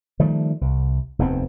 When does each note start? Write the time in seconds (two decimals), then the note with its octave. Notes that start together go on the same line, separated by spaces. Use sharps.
0.19 D#3 F3 G3 A3
0.61 C2
1.19 F1 D#2 B3 C4